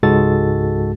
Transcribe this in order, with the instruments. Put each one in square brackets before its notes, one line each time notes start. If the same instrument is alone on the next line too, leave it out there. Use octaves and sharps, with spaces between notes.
[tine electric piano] C#2 G#2 G#3 F#4 A4 A6